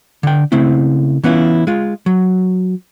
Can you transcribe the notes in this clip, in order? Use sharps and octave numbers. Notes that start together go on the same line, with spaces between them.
D3 G5
C#3 A3 C4 E4
E3 B3 C#4 E4 F4
G#3 F4
F#3